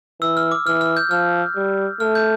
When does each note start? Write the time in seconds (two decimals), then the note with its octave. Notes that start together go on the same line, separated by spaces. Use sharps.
0.21 E3 E6
0.37 F6
0.52 D6
0.67 E3 F6
0.81 F6
0.97 G6
1.11 F3 F6
1.56 G3
2.00 A3 F6
2.15 G6